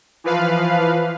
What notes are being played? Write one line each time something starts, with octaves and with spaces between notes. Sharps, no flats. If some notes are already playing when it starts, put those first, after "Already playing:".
E3 F3 B4 F5